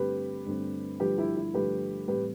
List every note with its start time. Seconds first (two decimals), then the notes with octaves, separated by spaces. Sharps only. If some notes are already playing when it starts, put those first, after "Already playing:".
Already playing: G2 D3 A3 C4 G4 B4
0.46 G2 D3 A3 C4
1.00 G2 D3 F3 A3 G4 B4
1.18 E4 G4
1.37 E4
1.54 G2 D3 F3 A3 G4 B4
2.07 A2 E3 G3 C4 G4 B4